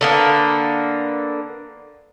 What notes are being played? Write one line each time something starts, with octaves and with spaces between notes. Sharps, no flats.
D3 A#3 B3